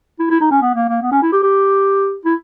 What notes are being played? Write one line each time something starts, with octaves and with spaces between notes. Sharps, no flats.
E4
E4
D#4
C#4
B3
A#3
A#3
B3
C#4
E4
G4
G4
E4